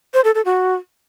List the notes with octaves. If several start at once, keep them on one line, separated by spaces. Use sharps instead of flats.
C5
A4
A4
F#4